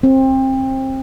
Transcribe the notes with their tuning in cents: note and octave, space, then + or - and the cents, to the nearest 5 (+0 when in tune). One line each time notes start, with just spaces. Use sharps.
C4 +25